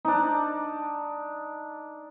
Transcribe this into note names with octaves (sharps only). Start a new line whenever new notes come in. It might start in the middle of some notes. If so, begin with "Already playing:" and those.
D4 D#4